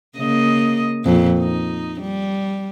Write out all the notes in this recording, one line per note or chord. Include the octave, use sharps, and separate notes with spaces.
C#3 A#3 D#5
F2 A#2
D#4
G3